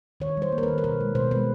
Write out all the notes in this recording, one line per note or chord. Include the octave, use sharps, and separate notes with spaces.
D#3 C#5
G3 C5
A#3
A#4
B4
D#3
A#4
B2 B4
G#3
B2 C5
G#3 B4